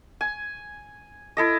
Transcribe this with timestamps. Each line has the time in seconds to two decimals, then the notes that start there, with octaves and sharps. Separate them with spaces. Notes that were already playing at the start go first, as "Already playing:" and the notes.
0.21 G#5
1.37 E4 A4 D#5